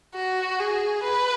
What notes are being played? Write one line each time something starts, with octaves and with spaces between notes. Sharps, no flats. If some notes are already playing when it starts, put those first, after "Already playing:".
F#4
G#4
B4